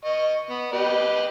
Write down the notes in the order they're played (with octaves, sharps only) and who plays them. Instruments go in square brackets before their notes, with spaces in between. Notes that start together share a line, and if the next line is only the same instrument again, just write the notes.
[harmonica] D#5 C#6
B3
G4 B4 D#5